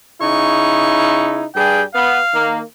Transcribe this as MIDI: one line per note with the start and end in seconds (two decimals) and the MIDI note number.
0.21 1.45 49
0.21 1.45 63
0.21 1.45 64
0.21 1.39 85
1.55 1.83 43
1.55 1.83 55
1.55 1.83 68
1.55 1.83 79
1.95 2.20 59
1.95 2.52 77
2.34 2.61 51
2.34 2.61 58